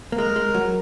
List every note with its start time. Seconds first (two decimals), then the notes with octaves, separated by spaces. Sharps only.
0.12 A#3
0.18 G#3 A#4
0.36 G#3
0.55 F#3